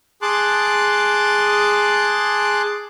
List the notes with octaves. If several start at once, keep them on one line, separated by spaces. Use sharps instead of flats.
G#4 A5 C6 D6 F#6